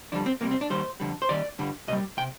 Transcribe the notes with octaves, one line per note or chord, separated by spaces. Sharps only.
F2 D3 G3 D4
C4
C2 C3 G3 A#3
C4
D4
D#2 D#3 G3 C5
F2 D3 G3
C5
D#2 D#3 G3 D5
G2 D3 G3
C2 A#2 G3 D#5
C3 G5